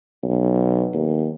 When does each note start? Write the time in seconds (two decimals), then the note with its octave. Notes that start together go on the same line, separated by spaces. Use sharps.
0.23 B1
0.94 D#2